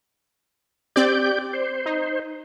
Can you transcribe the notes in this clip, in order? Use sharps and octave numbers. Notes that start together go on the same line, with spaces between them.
C4 G4 D5 G6
C5
D#4